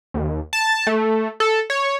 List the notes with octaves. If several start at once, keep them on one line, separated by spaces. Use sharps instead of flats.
D#2
A5
A3
A4
C#5